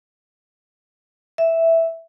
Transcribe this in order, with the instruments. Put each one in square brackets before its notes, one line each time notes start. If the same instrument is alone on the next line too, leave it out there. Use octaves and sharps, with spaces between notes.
[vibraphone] E5